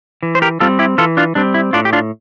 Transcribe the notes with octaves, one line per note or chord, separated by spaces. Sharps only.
E3
C5
G4 A#4
G3 C4 F4 A4
E4 G4
E3 F4 A4
D4 F4
G3 C4 D4
E4
A2 D4 F4
G4
D4 F4